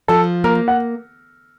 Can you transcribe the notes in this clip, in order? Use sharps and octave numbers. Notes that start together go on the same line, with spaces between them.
F3 A4
A#3 A#4
F#5